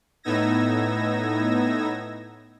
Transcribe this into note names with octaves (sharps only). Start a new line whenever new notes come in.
A2 B3 D#4 E6 G#6 A#6